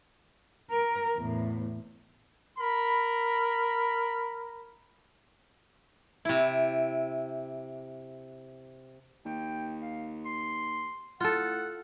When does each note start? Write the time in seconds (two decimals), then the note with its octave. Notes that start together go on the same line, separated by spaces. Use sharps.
0.71 A#4
1.17 E2 A2
2.58 A#4 B5
6.25 C3 E4
9.26 D#2 G5
9.82 F5
10.25 C6
11.20 A2 F4 A4 F#5